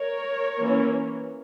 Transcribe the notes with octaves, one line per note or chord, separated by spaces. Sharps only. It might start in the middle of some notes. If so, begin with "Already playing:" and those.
Already playing: A#4 C#5
E3 A#3 C#4